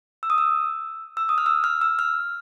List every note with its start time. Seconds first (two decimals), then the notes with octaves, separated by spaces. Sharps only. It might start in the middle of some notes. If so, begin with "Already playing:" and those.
0.23 E6
0.30 D#6
0.38 E6
1.17 E6
1.29 D#6
1.38 F6
1.46 E6
1.64 F6
1.81 E6
1.99 F6